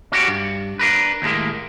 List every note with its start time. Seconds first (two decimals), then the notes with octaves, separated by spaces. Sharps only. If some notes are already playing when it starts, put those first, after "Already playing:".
0.12 C#4 F#4 G4
0.27 G2
0.79 D4 A#4 B4
1.22 D#2 A2 G#3 A#3